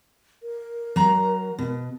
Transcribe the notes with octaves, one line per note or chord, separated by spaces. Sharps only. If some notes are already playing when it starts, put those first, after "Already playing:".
A#4
F#3 A#5
B2